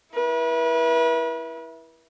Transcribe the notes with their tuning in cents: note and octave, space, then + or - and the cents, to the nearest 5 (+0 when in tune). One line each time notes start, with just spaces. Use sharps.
E4 +0 B4 -35